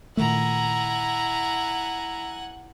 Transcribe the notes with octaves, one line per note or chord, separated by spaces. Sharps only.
A#2 D#3 A3 E4 F#5 G#5 A#5